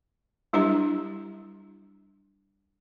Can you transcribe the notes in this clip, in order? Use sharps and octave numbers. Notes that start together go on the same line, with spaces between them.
F#3 G3 D4 E4 G4 A#5